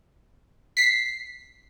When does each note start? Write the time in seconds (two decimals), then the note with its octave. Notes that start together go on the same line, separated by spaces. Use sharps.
0.77 B6 C7